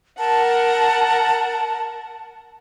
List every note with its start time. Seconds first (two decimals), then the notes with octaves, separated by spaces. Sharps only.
0.19 A#4 F#5 A5